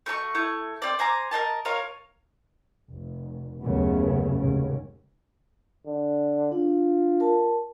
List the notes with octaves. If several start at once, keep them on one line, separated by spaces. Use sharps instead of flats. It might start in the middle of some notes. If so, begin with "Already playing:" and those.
A3 F#4 A5 C#6
A3 E4 C#6
C4 D5
C5 G#5 A#5 D6
A#4 C5 D#5 A5
F4 A#4 C#5 F5
F1
F#1 D#2 C#3 F#3 A3 B3
F1 D#2 G#2 C#3
D3
D4 F4
A#4 A5